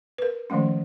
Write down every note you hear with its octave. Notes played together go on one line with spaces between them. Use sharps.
A#4 B4
D#3 F3 G#3 A3 C#4